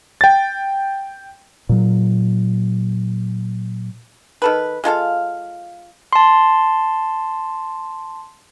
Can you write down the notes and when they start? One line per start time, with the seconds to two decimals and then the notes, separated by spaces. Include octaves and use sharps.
0.21 G5 A6
1.69 A#2 F#3
4.42 D#3 A4 B4
4.84 G#3 F4 A4 F5
6.13 A5 C6